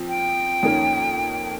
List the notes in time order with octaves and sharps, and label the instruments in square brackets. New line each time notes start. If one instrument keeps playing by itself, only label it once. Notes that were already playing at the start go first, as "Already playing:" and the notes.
Already playing: [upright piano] F3 C4
[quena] G5
[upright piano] F2 D#3 A#3 C#4